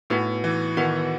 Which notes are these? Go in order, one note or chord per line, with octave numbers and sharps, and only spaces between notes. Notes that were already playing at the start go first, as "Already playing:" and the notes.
A2 B3 D#4 F#4 B4 F#5
E3
D#3 B3 D#4 F#4 B4 F#5